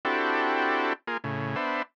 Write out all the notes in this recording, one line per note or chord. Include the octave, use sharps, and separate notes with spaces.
C4 D4 E4 F#4 G4 A4
A#3 F4 G#4
A2 C#3
B3 D4 C5 E5